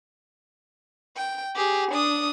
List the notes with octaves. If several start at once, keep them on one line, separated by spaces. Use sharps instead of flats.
G5
G4 G#4
D4 D#6